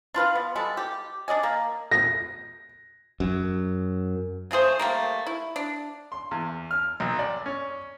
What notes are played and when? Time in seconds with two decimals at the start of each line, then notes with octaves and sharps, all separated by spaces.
0.14 D4 F4 B4 F5
0.35 B3
0.56 G3 G#3 A4
0.77 G4
1.28 D4 D5 D#5 G#5
1.43 A#3
1.91 A#6
3.20 F#2
4.51 C#3 A3 G#4 C5
4.79 G3 A3 A#3
5.27 E4
5.56 D4
6.12 C6
6.31 E2
6.71 F6
7.00 B1
7.19 D5
7.46 C#4